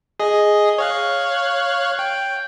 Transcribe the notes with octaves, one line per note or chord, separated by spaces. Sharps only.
G#4 D#5
C#5 F5 F#6
G5